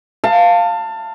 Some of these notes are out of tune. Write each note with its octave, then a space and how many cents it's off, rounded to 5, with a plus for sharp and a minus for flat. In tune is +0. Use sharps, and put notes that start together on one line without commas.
F5 +0 A5 +25